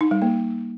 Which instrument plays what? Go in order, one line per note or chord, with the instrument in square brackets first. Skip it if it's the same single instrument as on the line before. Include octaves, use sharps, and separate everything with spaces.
[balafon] D#4
G3
A#3